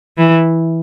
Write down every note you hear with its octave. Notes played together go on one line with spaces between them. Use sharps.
E3